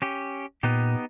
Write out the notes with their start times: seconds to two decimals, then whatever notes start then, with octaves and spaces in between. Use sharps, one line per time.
0.02 C#4 G4
0.63 A#2 B3 D#4 G4